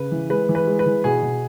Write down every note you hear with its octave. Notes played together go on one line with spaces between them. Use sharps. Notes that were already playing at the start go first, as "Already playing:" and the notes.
Already playing: C#3 B4
E3
G#3 B4
E3
B4
G#3
B4
E3
B2 G#4
B2